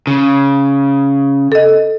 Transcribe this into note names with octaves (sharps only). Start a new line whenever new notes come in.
C#3
A4 D#5